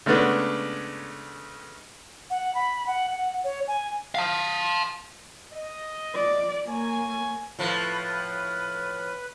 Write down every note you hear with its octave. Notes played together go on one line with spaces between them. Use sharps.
C#3 G#3 A3 B3 D4
F#5
B5
F#5
F#5
C#5
G#5
F5 A5
D#5
D5
A#3 C#5 G#5
A2 F3 B4